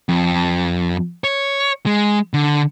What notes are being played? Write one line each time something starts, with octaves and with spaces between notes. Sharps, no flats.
F2
C#5
G#3
D3